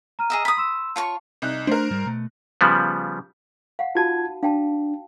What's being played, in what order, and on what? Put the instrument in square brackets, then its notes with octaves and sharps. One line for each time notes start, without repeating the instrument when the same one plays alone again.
[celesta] A#5 F6 D#7
[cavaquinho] G#4 D#5 E5
B5 D#6
[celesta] C6 E6 E7
[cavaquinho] F4 C#5 C#6 [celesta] A5
[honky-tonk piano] C2 D#4 F#6
[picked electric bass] A3 D4 [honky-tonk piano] A#4 C5
[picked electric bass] G#2 G3
B2 A3
[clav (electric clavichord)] C#3 F3 G3 B3
[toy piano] F5 F#5
[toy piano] D#4 F#4 A5 [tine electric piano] F4 G#6
[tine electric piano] D4 [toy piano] F5 G5 A5